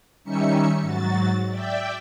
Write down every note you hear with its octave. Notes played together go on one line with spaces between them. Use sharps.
D#3 G3 C#4 D#4 E5 C#7
G#2 F#3 F#4 A6
D5 E5 G5